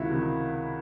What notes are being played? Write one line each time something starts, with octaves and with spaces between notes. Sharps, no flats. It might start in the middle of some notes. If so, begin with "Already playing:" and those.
Already playing: C#2 C3 D#3 E4 F#4
C3 D#3